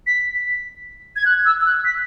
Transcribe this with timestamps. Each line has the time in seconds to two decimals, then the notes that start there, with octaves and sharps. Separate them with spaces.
0.07 B6
1.16 G#6
1.26 F#6
1.45 E6
1.61 E6
1.65 F#6
1.85 B6